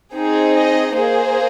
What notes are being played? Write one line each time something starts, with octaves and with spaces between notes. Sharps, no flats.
C4 D#4 G#4
D#5
A#3 G#4 C5